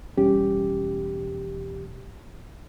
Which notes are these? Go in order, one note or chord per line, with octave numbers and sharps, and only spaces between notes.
E1 G3 C#4 G4